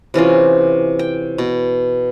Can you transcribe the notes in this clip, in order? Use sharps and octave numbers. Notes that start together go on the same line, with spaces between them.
C3 E3 C#4 F4
G5
B2